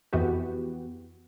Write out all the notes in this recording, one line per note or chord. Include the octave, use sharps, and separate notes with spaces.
F2 E3 B3 F#4 G4